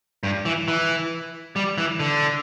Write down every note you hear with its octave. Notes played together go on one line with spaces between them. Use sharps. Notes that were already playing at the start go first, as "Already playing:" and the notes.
G2
E3
E3
G3
E3
D3